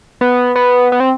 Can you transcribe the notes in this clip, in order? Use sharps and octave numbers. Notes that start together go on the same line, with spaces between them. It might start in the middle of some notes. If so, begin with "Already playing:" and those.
B3
B3
B3
C4